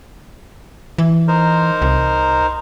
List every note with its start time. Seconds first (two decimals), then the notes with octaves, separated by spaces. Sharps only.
0.98 E3
1.28 D#4 A#4 C5
1.82 C2